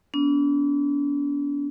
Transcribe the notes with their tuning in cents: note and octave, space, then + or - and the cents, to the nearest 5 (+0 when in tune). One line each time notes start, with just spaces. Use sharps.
B3 -10 D4 -40